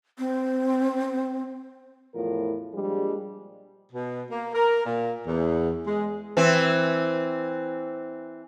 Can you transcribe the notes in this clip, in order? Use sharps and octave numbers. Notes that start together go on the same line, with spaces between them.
C4
E2 A2 F3 E4 F4 A#4
A#2 F3 G3 G#3 D4 G#4
B2
A#3
A#4
A#2
E2
G#3
E3 C4